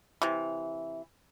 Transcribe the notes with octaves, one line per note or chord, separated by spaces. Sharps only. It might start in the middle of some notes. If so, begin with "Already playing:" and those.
C3 E3